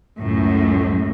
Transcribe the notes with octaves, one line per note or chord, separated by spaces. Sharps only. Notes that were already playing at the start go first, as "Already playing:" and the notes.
C#2 F#2 A2